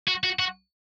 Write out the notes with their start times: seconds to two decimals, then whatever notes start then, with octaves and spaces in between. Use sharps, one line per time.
0.08 F#4
0.24 F#4
0.39 F#4